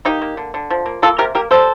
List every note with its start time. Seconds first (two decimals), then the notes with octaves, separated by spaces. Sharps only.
0.05 A#3 D#4 G4
0.22 A#3
0.37 D3
0.54 D3
0.70 F3
0.86 A#3
1.02 A#3 F4 A4
1.18 C3 G4 A#4
1.35 A#3 G4 A#4
1.51 G3 A4 C5